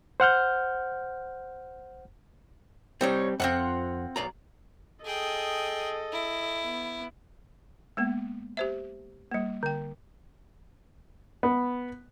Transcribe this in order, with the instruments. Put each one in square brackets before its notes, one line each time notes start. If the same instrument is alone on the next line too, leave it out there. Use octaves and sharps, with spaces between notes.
[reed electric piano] C5 F#5 F6 G6
[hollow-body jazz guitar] G3 C4 [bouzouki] D#4 C#5
[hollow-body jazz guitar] F2 [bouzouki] C4 F4 F#5
[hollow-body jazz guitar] B1 D5 A#5
[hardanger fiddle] G#4 G5 [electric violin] A4 D#5
[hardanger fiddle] E4
[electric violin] B3
[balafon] G#3 A#3 B3
G4 C5 E5
G3 A#3
D3 G5
[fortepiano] B3